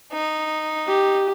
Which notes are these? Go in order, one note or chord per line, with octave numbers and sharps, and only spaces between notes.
D#4
G4